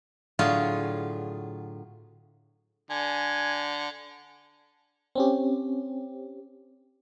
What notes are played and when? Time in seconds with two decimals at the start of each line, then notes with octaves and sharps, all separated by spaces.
0.39 A2 D3 F#3 F4 G#4
2.90 D3 G#5
5.15 C4 C#4 G4